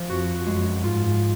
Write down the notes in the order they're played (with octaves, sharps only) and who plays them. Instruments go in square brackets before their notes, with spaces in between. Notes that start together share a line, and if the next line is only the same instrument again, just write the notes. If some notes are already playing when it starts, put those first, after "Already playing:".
Already playing: [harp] F3
[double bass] F2 [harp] F#4
[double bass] F#2 [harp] G#3
[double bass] G#2 [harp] F4